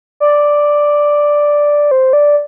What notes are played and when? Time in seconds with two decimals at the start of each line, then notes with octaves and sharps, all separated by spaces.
0.20 D5
1.91 C5
2.13 D5